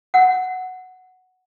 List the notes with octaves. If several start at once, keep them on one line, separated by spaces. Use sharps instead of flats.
F#5